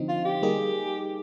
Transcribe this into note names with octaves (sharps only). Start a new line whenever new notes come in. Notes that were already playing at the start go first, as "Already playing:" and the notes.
Already playing: D3 F3 C4 D#4
F4
G4
G3 A#3 D#4 G#4